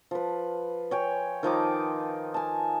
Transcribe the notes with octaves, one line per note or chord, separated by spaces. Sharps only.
F3 B4
C#5 G5 G#5
D#3 F3 D#4 D6
G#5 A5